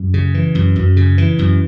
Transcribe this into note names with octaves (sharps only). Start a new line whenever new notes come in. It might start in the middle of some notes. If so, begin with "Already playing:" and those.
Already playing: F#2
C#3
E3
F#2
F#2
C#3
E3
F#2